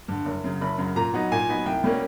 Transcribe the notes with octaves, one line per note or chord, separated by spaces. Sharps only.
G2 D3
F#1
F#2 C#3
F#1 B5
F#2 C#3
A#2 A#5
F#3 B3 D#4
A#2 G#5
F#3 B3 D#4
C2 G5
B2 G3 A#3 C#4